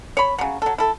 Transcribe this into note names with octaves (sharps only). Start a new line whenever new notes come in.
C#5 B5
C#3 F#3
F#3 A4
E4 A4